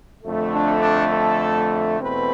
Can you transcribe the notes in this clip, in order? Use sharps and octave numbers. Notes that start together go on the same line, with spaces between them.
F2 D3 A3
D4
D4
A4
E2 B2 A3 C4 B4